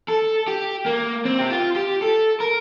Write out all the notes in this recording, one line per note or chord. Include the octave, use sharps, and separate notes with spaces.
A4
G4
A#3
C4
G4
F4
G4
A4
A#4